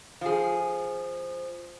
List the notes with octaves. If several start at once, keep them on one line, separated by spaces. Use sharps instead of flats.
F3 G#4